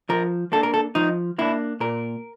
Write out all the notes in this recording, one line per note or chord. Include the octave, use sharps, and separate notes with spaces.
F3 A#4
A#3 D4 A4
A#4
A4
F3 D#4
A#3 D4 E4
A#2 A#4